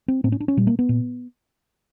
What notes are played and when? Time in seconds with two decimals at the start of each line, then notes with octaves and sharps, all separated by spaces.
0.08 C4
0.24 A2 C4
0.32 C#4
0.40 D4
0.48 C#4
0.57 A#2 G3
0.67 A#3
0.79 B3
0.89 A#2